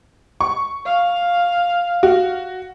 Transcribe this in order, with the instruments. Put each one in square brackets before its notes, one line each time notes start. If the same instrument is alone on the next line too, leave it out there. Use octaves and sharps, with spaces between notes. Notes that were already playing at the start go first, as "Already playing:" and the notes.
[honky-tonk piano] C#6
[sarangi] F5
[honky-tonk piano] F#4